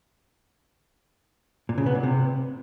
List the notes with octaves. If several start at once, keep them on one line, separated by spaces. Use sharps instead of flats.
A#2
C#3
B3
A#2
C3